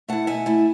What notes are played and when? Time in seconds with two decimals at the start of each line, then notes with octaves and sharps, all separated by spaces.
0.08 A3 E4 F#5 A5
0.27 B2 E5 G#5
0.46 A3 E4